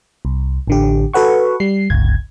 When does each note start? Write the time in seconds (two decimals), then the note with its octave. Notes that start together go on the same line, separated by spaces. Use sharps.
0.25 C2
0.67 A1 D3 G4
1.14 F#4 A4 B4 F#5 C#6
1.60 G3 C7
1.90 G1 C#2 G#6